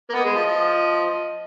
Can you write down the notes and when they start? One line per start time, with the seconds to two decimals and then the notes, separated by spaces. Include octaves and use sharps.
0.10 A#3
0.14 B3 D#5
0.25 G#3
0.36 F3
0.46 F3